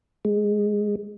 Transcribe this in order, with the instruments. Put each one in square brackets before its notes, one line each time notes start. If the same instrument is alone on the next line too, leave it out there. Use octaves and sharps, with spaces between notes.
[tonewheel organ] G#3